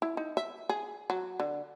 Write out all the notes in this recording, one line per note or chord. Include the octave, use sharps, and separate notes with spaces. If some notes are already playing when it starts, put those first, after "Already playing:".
E4
D#4
E5
G#4
F#3
D3